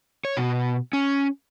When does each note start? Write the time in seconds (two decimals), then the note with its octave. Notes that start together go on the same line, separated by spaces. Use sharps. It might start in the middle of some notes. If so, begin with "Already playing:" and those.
0.25 C#5
0.37 B2
0.93 C#4